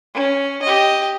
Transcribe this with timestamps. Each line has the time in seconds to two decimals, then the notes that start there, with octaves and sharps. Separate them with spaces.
0.15 C#4
0.62 G4 D#5